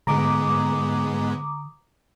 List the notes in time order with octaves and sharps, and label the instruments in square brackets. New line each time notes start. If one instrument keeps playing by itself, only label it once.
[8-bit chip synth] G#2 G#3 B3 [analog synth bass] D3 [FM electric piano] A#5 D6 D#6